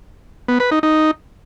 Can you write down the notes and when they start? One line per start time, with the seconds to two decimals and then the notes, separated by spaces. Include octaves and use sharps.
0.48 B3
0.60 B4
0.71 D#4
0.83 D#4